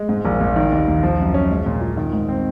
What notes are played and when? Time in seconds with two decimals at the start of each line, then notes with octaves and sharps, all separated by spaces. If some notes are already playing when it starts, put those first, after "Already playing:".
Already playing: G#3
0.09 G#2
0.25 A#1
0.40 A#1
0.56 D#3
0.72 D#2
0.88 D#2
1.03 F3
1.19 F#2
1.34 C#4
1.50 G#3
1.66 A#2
1.81 F4
1.97 D#3
2.13 G#2
2.29 C4